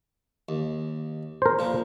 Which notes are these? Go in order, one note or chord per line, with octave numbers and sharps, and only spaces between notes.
D#2
A#4 C5
A#2 F3